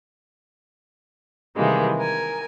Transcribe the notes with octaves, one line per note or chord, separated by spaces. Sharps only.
C3 D#3 E3 G3 G#3 A#3
A#4 G#5